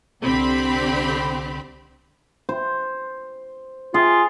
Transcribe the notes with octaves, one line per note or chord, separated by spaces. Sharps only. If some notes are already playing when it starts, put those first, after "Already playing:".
C2 D3 C4 G4 B5
C5
F4 G#4